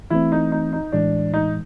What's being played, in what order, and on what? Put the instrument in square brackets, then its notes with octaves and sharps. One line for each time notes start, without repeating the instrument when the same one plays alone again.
[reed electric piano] E3 A3 C4 [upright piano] E4
[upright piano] D#4
D#4
D#4
[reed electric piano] A2 E3 G#3 [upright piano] D4
[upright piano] D#4